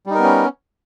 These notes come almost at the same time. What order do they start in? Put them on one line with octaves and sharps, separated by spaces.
G3 D#4 A#4 B3 C#4